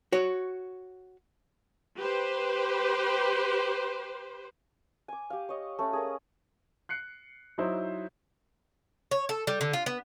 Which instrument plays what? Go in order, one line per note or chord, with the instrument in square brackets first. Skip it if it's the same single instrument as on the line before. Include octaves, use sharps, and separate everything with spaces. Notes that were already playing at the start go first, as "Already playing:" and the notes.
[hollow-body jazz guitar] F#4 C#5
[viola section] G4 B4 C5
[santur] G#5 D6
G4 F5
C#5 D#5
A3 C#4
G#4 A#4 D#6
[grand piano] F#6 C7 C#7
F#3 D#4 E4 C5
[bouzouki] C#5
A4
G3
D3
F4
B3